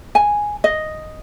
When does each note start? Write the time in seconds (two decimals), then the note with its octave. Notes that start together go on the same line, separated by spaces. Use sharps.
0.15 G#5
0.64 D#5